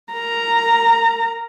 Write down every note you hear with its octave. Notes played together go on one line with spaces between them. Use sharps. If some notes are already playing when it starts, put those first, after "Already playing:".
A#4 A#5